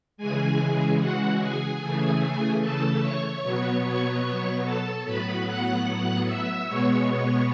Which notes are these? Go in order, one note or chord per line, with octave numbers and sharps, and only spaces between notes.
C#3 E3 G#3 G#4 G#5
F#4 F#5
G#4 G#5
C#3 E3 A3
A4 A5
C#5 C#6
B2 F#3 B3
C#5 C#6
A4 A5
A2 F#3 B3 B4 B5
F#5 F#6
E5 E6
B2 G#3 B3 C#5 C#6
C#5 C#6